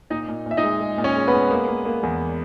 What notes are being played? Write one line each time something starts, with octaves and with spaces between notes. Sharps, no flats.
A#2 D#4 D#5
A#2
A#2
E5
D#4 D#5
G#3
G#3
A#2
C#4 C#5
G#3
B3 B4
G#3
A#3
A#3
A#3
E2